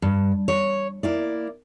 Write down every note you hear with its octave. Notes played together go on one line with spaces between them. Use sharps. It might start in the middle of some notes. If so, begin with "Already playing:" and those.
G2
C#5
A#3 E4 D5